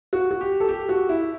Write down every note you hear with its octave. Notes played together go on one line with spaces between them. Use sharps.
F#4
F#4
G4
A4
G4
F#4
E4